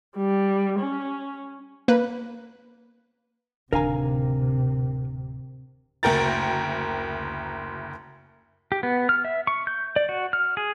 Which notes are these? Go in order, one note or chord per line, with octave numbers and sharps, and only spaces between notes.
G3
C#4
A#3 B4
D1 C3 D#3 D4 A#4 F5 G#5 A#5
F#1 D2 A#4 G5 A#5 A6
G4
B3
F6
E5
C#6
G6
D5
F#4
F6
G#4